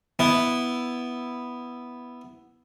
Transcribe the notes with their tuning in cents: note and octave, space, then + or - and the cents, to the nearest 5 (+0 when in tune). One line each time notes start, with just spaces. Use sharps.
B3 +0 E4 +0